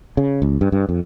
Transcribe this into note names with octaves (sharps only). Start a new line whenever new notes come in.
C#3
C#2
G2
G2
F2